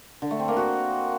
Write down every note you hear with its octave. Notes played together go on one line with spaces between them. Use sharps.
D3
A3
C4
A#3
F#4